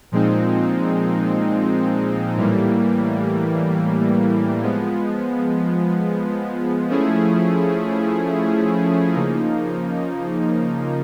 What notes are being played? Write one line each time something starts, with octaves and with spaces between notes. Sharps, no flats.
A#2 F3 G#3 C4 D#4
A2 E3 G3 A#3
F3 G#3 B3
F3 A3 C#4 E4 G#4
C#3 F3 A#3 D#4